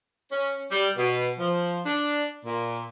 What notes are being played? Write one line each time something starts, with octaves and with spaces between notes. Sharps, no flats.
C#4
G3
B2
F3
D4
A#2